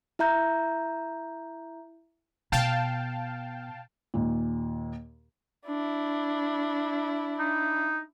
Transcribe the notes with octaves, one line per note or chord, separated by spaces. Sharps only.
E4 E5 A#5 G6
B2 F5 G5 A5
D#2 A#2
D4 E4
D#4